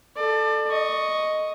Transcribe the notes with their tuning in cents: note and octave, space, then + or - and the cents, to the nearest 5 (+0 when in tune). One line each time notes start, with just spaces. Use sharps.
A4 +0 D5 +30
D#5 +0 C#6 +0